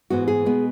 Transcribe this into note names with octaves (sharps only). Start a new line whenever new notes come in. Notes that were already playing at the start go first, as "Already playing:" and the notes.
G#2 E3 G#3 B3 F#4
G#4
B2 G#3 B3